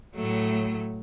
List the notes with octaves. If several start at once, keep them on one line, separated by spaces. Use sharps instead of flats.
A2 F#3 A3